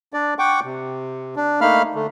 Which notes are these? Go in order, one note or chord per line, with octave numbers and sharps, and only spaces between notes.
D4 D5
F#5 G5 C#6 D6
C3
D4
A3 A#3 D#4 F5 B5 F6
D3 A3